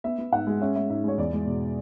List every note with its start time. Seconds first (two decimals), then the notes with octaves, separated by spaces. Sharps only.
0.04 B3 E5
0.18 B3
0.32 G#2 F#5
0.47 G#3
0.61 C#4 E5
0.75 G#3 E5
0.89 G#2 E5
1.04 G#3 C#5
1.18 E2 D5
1.33 G#3
1.46 B2